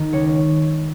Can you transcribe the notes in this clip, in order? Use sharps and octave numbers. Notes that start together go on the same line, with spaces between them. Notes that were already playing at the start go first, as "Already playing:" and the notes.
Already playing: D#3
C#2 C#5